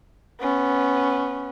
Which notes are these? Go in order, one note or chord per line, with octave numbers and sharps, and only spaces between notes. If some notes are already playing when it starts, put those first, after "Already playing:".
B3 C#4